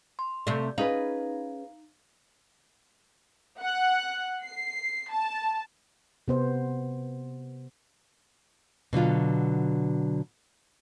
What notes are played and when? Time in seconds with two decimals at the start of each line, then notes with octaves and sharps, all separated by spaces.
0.19 C6
0.47 C3 A3 D5
0.78 C#4 D#4 G#4 B4 F5
3.60 F#5
4.43 C7
5.10 A5
6.28 C3 B3 C5
8.93 B2 D3 F#3 F4